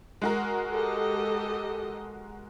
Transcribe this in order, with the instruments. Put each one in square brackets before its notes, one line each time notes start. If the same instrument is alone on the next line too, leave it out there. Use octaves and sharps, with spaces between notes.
[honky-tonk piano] G#3 F#4 A#4
[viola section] G4 A4 D#5